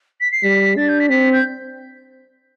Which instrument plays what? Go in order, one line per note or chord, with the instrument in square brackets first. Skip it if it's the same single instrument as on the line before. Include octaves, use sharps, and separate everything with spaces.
[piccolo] B6
C7
[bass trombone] G3 [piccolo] B6
[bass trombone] D4 [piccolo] A6
[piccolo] G6
B6
[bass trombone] C4 [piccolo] B6
[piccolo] G6